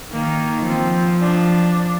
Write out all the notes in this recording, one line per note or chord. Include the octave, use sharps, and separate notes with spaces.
D#3 A#3
F3 C4
D4